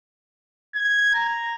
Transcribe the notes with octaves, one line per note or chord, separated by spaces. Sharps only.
G#6
A#5